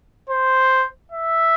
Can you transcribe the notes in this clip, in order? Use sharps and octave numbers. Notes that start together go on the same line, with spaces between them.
C5
E5